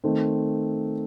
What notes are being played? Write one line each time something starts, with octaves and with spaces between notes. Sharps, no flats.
D#3 A3 C4